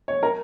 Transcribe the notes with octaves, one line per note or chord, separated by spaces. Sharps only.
C#5
A#4